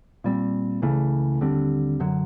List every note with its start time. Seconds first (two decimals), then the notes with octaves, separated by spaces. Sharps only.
0.24 A#2 G3 C4
0.82 C#2 C#3 E3 A3
1.41 D#2 D3 G3 C4
2.00 F#2 D3 F#3